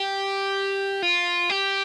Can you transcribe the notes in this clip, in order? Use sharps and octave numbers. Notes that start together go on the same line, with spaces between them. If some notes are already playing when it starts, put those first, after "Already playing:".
Already playing: G4
F4
G4